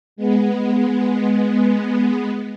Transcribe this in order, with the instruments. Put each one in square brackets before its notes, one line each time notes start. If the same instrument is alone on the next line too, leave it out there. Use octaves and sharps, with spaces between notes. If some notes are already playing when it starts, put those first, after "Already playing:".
[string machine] G#3 B3